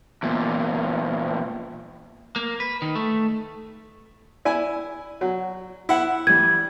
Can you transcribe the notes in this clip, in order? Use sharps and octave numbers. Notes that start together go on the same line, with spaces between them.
E2 A#2
A#3
B4
D#3
A3
E4 D5 G#5
F#3
E4 F#5
E3 G3 G#6